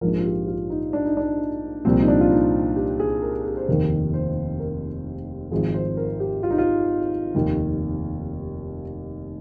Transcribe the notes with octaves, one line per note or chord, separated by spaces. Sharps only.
A#1 G#2 F3 A#4
F4
G4
F4
D#4
D4
D#4
D4
C2 A#2 F3 C4
D#4
D4
F4
D#4
G4
G#4
A#4
G#4
C5
F1 D#2 D#3 A#4
C5
A#4
G#1 G#2 F3 G#4
C5
A#4
G4
F4
D#4
F4
F1 D#2 D#3